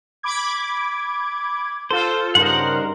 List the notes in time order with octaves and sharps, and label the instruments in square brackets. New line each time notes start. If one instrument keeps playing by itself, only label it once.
[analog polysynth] B5 D6 G#6
[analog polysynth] F4 A4 [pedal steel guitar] C5
[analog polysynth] G2 D#4 A#4 [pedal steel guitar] C#3 C5 F#5